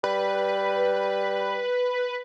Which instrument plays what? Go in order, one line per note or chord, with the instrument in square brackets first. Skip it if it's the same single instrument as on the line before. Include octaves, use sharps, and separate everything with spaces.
[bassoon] G3 [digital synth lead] B4